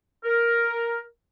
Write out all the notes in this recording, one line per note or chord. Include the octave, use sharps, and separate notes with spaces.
A#4